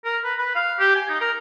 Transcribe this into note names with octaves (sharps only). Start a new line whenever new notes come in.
A#4
B4
B4
F5
G4
G#5
D#4
A#4